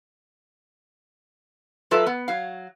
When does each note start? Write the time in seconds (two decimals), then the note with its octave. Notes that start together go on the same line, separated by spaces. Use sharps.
1.91 F#3 F4 A4 B4 E5
2.06 B3
2.28 F#3 F5